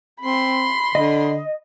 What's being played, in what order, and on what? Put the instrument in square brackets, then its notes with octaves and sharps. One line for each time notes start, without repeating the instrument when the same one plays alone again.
[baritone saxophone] C4 [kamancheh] B5 C6
[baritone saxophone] D3 [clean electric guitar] D#5